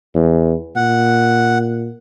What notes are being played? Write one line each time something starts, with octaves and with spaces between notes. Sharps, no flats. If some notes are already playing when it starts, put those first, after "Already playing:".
E2
A#2 F#5